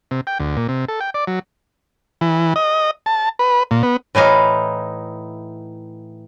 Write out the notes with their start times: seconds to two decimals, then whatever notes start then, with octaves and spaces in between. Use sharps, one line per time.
0.11 C3
0.27 G5
0.40 D2
0.57 A#2
0.69 C3
0.88 A4
1.01 G5
1.14 D5
1.27 F#3
2.21 E3
2.56 D#5
3.06 A5
3.39 B4
3.71 A#2
3.83 B3
4.15 A2 E3 D#4 F5